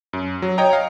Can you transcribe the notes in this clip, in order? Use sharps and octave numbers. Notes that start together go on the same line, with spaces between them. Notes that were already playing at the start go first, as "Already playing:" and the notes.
F#2
F#3
C#5 D#5 G5 A#5
F5